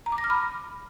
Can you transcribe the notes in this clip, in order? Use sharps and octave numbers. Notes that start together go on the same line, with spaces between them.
A#5
D6
A#6
F6
B5